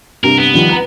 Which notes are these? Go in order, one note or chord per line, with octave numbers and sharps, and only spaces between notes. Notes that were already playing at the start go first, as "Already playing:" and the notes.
G2 C3 A#4
B3
D#3 F3 G3
B4 A#5 E7